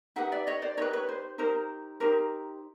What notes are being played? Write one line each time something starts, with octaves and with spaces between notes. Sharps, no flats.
D#4 G4 B4 E5 F#5
D5 E5
C#5 D#5
C5 D5
D#4 G4 B4 C#5 D#5
B4 C#5
C5
D#4 G4 A#4 C5
D#4 G4 A#4 C5